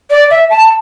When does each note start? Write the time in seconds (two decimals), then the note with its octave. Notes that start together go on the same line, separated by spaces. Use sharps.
0.10 D5
0.30 E5
0.50 A5